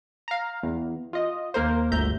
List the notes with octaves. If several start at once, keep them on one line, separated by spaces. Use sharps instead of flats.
F5 A#5
E2
F4 D#5
D#2 A#3 A#4 C5
G1 D2 E5 A#5 G6